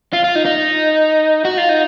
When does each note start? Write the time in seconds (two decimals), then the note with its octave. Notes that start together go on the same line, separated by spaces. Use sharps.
0.13 F4
0.24 F4
0.35 D#4
0.45 D#4
1.45 F#4
1.58 F4
1.69 D#4